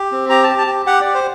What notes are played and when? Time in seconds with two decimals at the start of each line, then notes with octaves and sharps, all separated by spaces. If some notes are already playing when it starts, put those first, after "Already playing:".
Already playing: G4
0.12 C4
0.29 G4 A#5
0.44 G4 A5
0.58 A5
0.67 G4
0.86 G4 F#5
1.01 G4 D5
1.14 C5